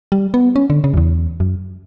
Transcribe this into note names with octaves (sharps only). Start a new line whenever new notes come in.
G3
B3
C#4
D3
C#3
F#2
E2
F#2